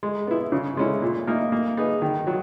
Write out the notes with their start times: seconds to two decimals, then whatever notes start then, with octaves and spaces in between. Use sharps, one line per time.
0.03 G#3
0.27 B3 E4
0.52 C#3
0.77 G#3 C#4 E4
1.02 A#2
1.27 A#3 D#4 A#4
1.52 A#3
1.77 D#4 G#4 B4
2.02 D#3
2.27 F#3